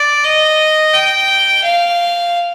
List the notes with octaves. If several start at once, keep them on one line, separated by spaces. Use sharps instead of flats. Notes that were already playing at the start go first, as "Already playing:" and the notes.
Already playing: D5
D#5
G5
F5